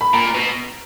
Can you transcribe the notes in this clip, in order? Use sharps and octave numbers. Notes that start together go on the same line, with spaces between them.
B5
A#2 A#5
B2